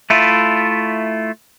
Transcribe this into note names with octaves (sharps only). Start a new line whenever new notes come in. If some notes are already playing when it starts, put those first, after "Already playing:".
A3 E4 F4